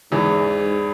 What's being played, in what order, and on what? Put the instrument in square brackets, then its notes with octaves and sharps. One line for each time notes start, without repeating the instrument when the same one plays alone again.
[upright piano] E2 E3 [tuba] G#2